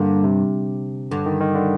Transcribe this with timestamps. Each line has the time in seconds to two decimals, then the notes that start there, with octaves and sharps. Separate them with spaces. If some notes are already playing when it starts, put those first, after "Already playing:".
Already playing: G2 D3 A#3
0.24 C3
1.11 G2 D3
1.26 D#3
1.41 D#3
1.55 D3